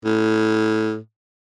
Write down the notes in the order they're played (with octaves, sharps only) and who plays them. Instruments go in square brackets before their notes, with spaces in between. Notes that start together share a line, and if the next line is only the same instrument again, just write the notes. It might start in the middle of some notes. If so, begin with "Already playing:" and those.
[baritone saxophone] A2